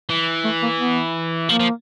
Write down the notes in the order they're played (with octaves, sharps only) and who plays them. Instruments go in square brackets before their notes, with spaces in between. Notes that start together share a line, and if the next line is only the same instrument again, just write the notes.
[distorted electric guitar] E3
[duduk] A3
A#3
B3
[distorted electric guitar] F3 [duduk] A#3
[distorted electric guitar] F3